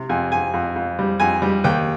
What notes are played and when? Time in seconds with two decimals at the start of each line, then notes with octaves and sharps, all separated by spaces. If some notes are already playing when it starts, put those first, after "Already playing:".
Already playing: C3
0.09 F2 G#5
0.32 F2 G#5
0.54 F2
0.76 F2
0.99 G3
1.20 F2 G#5
1.42 G3
1.64 D#2 G5